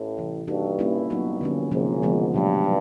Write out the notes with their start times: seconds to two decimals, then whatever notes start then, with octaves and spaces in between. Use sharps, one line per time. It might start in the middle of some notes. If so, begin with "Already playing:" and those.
Already playing: A1 A2
0.17 C3 E3 G3
0.48 G2 G3 A#3 D#4 F#4 A4
0.79 G3 A#3 C#4 E4
1.10 G2 F#3 B3 D#4 F#4
1.41 D3 F3 A#3 C#4
1.71 G#1 G#2 C3 F3 A#3 C#4
2.02 D3 F3 G#3 B3
2.33 G2 B2 F#3 A3
2.64 F#3